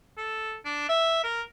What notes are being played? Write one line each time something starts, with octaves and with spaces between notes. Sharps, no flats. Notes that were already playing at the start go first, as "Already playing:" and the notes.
A4
D4
E5
A#4